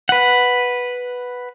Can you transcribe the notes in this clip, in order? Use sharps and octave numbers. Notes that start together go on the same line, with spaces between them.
B4 F#5